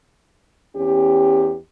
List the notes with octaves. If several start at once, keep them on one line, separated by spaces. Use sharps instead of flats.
E2 C#4 G4